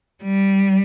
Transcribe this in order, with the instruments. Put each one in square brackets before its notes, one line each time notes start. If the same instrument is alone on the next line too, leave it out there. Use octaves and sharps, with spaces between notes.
[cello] G3